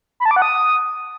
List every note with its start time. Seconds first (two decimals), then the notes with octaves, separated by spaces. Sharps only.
0.20 B5
0.25 A5
0.31 D6
0.36 F#5
0.42 D#6